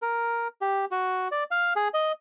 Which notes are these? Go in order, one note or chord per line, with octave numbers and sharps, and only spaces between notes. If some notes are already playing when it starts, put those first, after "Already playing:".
A#4
G4
F#4
D5
F5
G#4
D#5